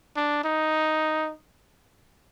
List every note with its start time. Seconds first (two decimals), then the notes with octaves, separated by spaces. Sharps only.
0.16 D4
0.44 D#4